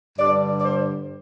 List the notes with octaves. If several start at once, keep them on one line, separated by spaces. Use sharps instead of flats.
G2 D3 D5
D5
C5